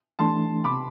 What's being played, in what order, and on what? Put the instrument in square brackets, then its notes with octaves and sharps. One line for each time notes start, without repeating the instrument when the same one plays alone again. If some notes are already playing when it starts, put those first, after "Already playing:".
[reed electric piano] E3 A3 D4 [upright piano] A5 C6
[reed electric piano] C3 [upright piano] B5 D6